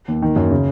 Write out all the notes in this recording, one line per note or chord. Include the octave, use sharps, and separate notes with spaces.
D#2
D#3
F#2
C#3